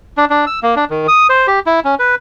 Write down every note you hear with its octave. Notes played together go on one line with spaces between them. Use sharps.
D4
D4
E6
A#3
D4
D#3
D#6
C5
G4
E4
C#4
B4